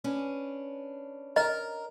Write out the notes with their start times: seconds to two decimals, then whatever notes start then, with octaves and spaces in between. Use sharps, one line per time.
0.04 C#4 D4 B4
1.36 A#4 D#5